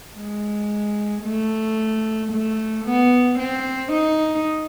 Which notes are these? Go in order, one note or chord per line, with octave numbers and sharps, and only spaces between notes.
G#3
A3
A3
B3
C4
D#4